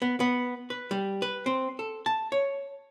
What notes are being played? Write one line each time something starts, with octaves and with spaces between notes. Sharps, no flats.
B3
B3
B4
G3
B4
C4
A4
A5
C#5